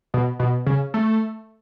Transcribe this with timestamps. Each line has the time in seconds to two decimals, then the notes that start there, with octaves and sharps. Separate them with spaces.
0.14 B2
0.39 B2
0.66 C#3
0.94 A3